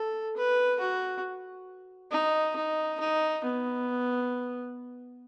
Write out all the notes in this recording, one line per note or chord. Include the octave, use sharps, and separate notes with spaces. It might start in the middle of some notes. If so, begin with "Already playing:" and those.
Already playing: A4
B4
F#4
D#4
D#4
D#4
B3